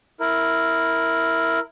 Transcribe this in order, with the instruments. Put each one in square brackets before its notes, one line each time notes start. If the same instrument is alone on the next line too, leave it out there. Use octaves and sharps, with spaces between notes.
[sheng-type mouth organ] E4 A#4